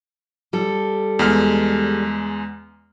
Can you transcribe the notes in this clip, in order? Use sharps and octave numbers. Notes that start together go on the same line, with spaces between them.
G3 A4
E2 G#3 F6